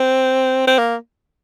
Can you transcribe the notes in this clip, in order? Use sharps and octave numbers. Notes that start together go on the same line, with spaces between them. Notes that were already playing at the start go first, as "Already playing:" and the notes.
Already playing: C4
C4
A#3